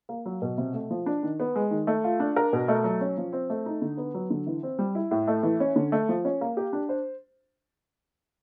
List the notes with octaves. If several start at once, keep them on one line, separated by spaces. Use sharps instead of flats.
A#3
F#3
B2
C3
A3
F3
D4
D#3
B3
G#3
D#3
A3
F4
D4
A#4
B2
A3
F#3
C#4
F3
C4
A3
D#4
D3
B3
F#3
D3
E3
C4
G3
E4
A2
A3
E3
C#4
D3
A3
F3
C#4
A#3
G4
D4
C5